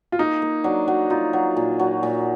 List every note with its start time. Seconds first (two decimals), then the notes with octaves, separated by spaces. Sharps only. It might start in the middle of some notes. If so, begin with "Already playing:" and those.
0.12 F4
0.19 A#3 D#4
0.42 A#3
0.64 F#3 D4
0.88 F#3
1.10 D#4 F4
1.33 F#3
1.56 A#2
1.79 F#3
2.03 A#2